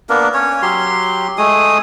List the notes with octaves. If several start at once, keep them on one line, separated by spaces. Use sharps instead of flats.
A#3 B3 D4 A#4
C#4 C#5
F#3 G4 C6
G#3 A3 G#4 D#6